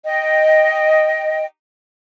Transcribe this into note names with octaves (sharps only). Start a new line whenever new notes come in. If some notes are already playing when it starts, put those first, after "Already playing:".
D#5 G5